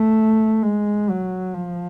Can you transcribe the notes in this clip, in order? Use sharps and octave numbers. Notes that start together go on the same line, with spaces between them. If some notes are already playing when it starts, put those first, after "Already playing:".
Already playing: A3
G#3
F#3
F3